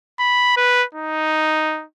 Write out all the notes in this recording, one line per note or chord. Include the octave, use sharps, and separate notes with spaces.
B5
B4
D#4